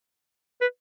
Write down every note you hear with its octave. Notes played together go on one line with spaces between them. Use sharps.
B4